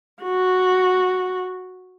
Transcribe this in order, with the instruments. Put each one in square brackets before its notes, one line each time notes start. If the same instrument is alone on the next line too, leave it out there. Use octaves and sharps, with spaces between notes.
[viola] F#4